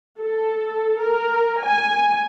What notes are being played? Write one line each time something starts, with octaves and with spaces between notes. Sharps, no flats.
A4
A#4
G#5